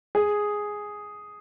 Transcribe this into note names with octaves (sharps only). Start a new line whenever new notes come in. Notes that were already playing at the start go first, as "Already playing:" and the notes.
G#4